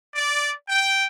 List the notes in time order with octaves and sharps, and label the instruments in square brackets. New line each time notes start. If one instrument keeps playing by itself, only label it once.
[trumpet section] D5
G5